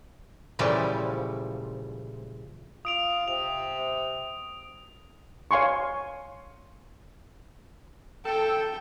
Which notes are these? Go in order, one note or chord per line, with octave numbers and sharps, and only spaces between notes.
A#2 C#3 E3 F3 G3 A3
F4 D#6 D7 F7
C3 F7
C#5 F5 G#5 C6 C#6
A4 G5